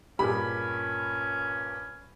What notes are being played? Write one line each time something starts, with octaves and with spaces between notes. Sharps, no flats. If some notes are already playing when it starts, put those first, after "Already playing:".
G2 A#2 C#4 G4 G#4 B5